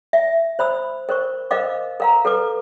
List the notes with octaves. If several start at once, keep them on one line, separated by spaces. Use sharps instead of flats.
E5
C5 B5 E6
A#4 C5 C#6
A#4 C5 D#5 F5 D6
A#4 F5 A#5
A4 B4 D6